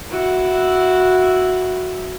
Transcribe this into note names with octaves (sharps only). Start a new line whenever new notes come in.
E4 F#4